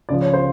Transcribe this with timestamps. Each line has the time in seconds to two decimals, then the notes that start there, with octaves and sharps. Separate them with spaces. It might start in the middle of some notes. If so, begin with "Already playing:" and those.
0.09 C#2 C#3 F3 D5
0.21 C#5
0.33 C5